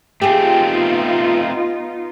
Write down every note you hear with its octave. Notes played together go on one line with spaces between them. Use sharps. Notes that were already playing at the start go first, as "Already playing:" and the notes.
A3 B3 C4 D#4 F4 G4 G#4